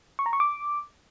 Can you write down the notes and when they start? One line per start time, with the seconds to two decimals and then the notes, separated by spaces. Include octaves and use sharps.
0.19 C#6
0.26 A#5
0.33 C#6
0.40 D6